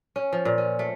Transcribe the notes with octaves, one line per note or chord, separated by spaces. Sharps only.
C#4
F3
A#2
C#4
A3